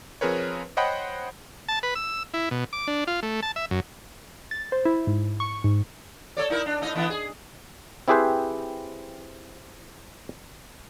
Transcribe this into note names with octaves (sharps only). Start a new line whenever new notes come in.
F3 C4 G#4 A#4 B4 C#5
C5 C#5 D#5 F#5 G5 B5
A5
B4
E6
E4
B2
D6
D4
F4
A3
A5
E5
F#2
A6
C5
E4
G#2
C#6
G#2
A4 C#5 D5
D#4 E4 A#4
D4
A2 D#4 D#5
D3 E3 B3
G#4
C4 E4 G4 G#4 B4 C5